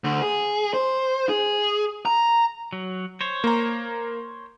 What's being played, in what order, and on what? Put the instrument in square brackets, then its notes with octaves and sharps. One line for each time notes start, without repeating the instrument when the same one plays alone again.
[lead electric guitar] D2
G#4
C5
G#4
A#5
[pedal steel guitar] F#3
C5 C#5
[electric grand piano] A#3 A#5